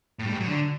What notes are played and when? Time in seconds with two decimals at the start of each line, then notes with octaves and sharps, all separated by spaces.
0.19 A2
0.26 G3
0.33 G#2
0.40 F#3
0.47 D3